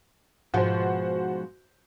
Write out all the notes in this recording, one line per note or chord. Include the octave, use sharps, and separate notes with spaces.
G#2 B2 F3 F#4 C5